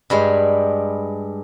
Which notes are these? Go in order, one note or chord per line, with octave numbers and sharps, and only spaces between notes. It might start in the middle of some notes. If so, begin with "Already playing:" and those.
G2 G3 G#3